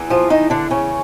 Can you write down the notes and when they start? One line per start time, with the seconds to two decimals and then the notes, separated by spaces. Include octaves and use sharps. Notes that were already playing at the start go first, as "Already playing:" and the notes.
Already playing: E2 E3
0.10 F3 F4
0.30 D#3 D#4
0.50 D3 D4
0.71 C#3 C#4